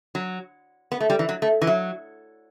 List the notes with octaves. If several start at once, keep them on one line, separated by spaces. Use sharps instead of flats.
F#3
B3
A3
G3
E3
F#3
A3
E3
F#3